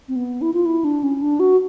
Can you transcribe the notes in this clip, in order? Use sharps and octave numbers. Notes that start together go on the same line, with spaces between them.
C4
B3
E4
F4
E4
D4
C#4
D4
F#4